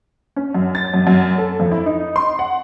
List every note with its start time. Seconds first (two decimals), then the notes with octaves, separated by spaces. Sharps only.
0.36 C#4
0.54 F#2
0.75 A6
0.94 F#2
1.07 F#2
1.38 A4
1.60 F2
1.71 E4
1.86 D#4
2.16 C6
2.39 F#5